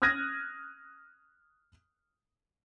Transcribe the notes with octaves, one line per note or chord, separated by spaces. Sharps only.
D#6 F6 F#6 G#6 A#6 D#7